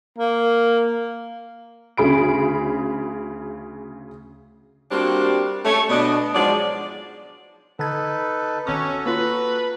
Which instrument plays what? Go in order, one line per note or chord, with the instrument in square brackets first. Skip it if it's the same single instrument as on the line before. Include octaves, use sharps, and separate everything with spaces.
[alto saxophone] A#3
[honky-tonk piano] D2 C#3 G#4 B5 D7
[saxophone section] G3 A#3 C4 D4 F#4 G4
A3 C#5
B2 D4 D#5
G#2 F3 F#3 G#3 D5
[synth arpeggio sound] D3 G#6 [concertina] D#4 A4 B4
[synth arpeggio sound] G#1 D6 [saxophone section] C#4 [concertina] F#4 A4 A#5
[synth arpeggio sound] A#3 F4 [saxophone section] B4